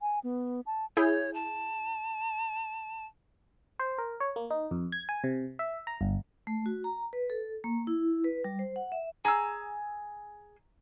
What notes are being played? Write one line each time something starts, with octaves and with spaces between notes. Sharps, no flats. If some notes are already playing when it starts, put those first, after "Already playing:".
G#5
B3
A5
E4 G#4 C#5 G6
A5
C5
A#4
C#5
A#3
D#4
F2
G#6
G#5
C3
E5
A#5
G1
A3
F#4
A#5
B4
A4
A#3
E4
B4
G3
C5
F#5
E5
G#4 A#5 E6